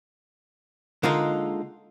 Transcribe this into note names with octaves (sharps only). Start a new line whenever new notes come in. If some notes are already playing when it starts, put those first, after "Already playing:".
D3 G#3 A#3 D#4 F4 A#4